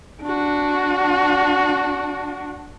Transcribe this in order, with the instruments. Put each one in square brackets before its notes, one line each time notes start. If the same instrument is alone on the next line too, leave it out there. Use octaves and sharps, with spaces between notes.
[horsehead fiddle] D4 F#4